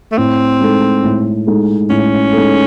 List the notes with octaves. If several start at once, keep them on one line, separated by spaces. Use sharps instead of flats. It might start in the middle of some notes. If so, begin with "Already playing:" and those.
A3
A2 C4
G#3 D#4 A4
A2
G#3 D#4 A4
A2 C#4
G#3 D#4 A4